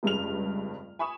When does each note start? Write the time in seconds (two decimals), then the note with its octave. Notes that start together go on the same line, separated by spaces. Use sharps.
0.03 F1 C#2 G2 C#3 F6 F7
0.99 G#5 B5 C#6 D#6 E7